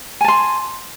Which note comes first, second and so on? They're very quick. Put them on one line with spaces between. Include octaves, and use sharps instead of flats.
G#5 A5 C6